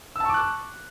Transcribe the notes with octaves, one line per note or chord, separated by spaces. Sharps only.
A5 C#6 D6 E6 F#6